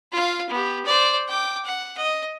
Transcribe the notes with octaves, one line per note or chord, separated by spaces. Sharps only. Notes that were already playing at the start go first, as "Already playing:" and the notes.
F4 F5
B3 G4
C5 D5
G5 D6
F#5
D#5